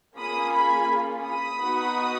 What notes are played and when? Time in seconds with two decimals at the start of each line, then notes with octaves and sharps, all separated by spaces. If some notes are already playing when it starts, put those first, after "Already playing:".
0.16 A#3 C#4 F4 G#4 B5 D#6
0.51 G#5 B5
1.24 B5 D#6
1.60 B3 D#4 F#4